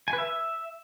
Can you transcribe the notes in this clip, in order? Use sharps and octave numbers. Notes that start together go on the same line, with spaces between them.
G#5
B4
E5